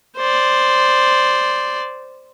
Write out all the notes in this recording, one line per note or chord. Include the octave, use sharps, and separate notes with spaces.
C5 D5